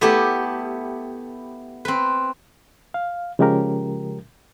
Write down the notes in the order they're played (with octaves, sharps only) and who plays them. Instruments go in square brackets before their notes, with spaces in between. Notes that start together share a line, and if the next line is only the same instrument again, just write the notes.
[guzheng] A3 B3 E4 G4
C4 B4
[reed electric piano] F5
C#3 F3 G#3 C#4 G4 A#4